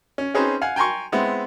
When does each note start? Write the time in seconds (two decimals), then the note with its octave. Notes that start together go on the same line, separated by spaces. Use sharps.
0.18 C#4
0.34 C4 C#4 D#4 G#4 B4 C5
0.61 F5 F#5 G#5
0.76 G5 G#5 A#5 C6 C#6
1.12 G#3 B3 C4 E4